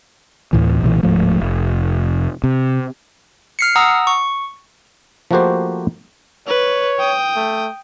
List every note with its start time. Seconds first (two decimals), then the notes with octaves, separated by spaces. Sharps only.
0.53 D2 A2 E3
0.83 B1 A#2 E3
1.03 D1 G#2 F3 A3
1.41 F1
2.44 C3
3.59 F6 C7 C#7
3.76 F#5 A#5 D#6 E6
4.07 C#6
5.31 F3 A3 A#3 F#4 G4 C5
6.48 B4 C#5
6.99 G5 D#6
7.36 A3